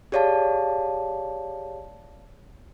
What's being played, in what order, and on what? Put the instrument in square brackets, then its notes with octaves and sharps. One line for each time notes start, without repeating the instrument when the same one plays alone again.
[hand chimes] G4 G#4 C#5 D5 F5 A5